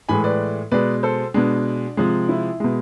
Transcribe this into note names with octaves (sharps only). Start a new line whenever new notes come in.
A2 E3 G#3 G#5 B5
B4 D5
B2 G#3 B4 D5
A4 C5
B2 G#3 D4
C3 F3 G#3
E4
B2 G#3